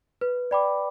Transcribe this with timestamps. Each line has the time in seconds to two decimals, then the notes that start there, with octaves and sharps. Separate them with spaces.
0.21 B4
0.51 D5 G5 B5 D6